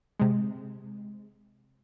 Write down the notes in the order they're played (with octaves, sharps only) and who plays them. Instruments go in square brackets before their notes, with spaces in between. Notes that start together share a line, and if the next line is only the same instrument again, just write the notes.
[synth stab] C3 G#3